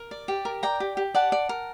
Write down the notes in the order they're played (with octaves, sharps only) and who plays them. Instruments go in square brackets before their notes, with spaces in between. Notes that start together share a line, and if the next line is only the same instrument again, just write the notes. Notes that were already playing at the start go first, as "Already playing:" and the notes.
Already playing: [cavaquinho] A#4
D5
G4
A#4
D5 G5 A#5
G4
G4
D5 F#5 A5
D5
A#4